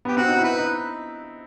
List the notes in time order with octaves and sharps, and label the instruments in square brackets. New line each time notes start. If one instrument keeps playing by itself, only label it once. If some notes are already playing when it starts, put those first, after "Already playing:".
[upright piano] B3 [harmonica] G4
[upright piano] C4 [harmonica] F#4
[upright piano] D#4
E4
[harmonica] B4
[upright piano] D#4